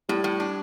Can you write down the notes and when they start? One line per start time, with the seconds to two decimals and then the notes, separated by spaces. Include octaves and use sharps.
0.09 A2 G3
0.24 A2
0.40 D4